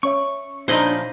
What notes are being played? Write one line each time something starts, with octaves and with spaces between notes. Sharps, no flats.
C#4 C#5 E5 C#6
A#2 F3 D4 D#4 C5 D#5 B5